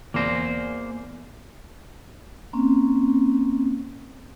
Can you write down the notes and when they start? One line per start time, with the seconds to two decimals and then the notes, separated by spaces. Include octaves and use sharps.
0.14 E2 A#3 C5 A#6
2.53 A#3 C4 C#4